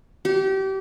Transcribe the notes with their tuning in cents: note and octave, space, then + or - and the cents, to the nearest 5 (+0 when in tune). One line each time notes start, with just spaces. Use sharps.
G4 -30